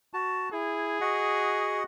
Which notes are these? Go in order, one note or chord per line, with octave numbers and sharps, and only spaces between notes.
F#4 A5
E4 G#4
F#4 D#5 F#5